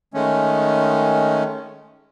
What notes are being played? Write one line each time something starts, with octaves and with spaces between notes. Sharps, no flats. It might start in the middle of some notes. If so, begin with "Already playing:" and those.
D#3 G#3 A3 C#4